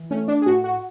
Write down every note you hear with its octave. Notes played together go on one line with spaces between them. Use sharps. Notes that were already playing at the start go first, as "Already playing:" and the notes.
Already playing: E3
A3 C#4
D4
G#4
A2 F#4
F#4